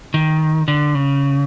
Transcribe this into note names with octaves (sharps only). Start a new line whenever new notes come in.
D#3
D3
C#3